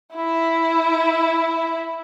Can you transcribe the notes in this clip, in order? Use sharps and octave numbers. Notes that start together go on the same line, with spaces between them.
E4 E5